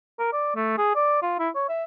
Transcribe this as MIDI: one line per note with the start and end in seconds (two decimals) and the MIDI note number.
0.19 0.29 70
0.33 0.54 74
0.56 0.73 57
0.78 0.91 68
0.96 1.22 74
1.22 1.39 65
1.39 1.50 64
1.55 1.67 73
1.69 1.84 76